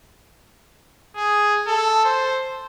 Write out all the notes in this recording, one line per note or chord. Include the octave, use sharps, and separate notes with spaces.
G#4
A4
C5